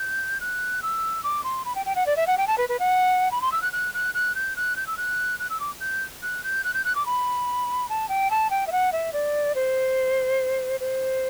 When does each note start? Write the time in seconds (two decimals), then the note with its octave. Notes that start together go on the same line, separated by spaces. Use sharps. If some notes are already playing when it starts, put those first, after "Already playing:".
Already playing: G6
0.40 F#6
0.82 E6
1.23 D6
1.44 C6
1.65 B5
1.75 G5
1.86 G5
1.96 F#5
2.06 D5
2.17 E5
2.27 F#5
2.38 G5
2.48 A5
2.58 B4
2.69 B4
2.79 F#5
3.31 B5
3.42 C6
3.52 E6
3.62 F#6
3.73 F#6
3.94 F#6
4.14 F#6
4.35 G6
4.56 F#6
4.76 G6
4.87 E6
4.97 F#6
5.39 F#6
5.50 E6
5.60 D6
5.80 G6
6.22 F#6
6.43 G6
6.64 F#6
6.74 G6
6.85 F#6
6.95 D6
7.06 B5
7.89 A5
8.09 G5
8.31 A5
8.50 G5
8.67 E5
8.72 F#5
8.92 E5
9.13 D5
9.55 C5
10.80 C5